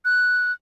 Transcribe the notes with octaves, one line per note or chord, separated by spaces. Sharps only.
F#6